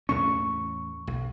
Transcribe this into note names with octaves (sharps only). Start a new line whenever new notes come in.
E2 A2 C#4 C#6
B1